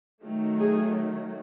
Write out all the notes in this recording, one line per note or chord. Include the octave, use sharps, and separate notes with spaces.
D#3 F#3 A3
G#4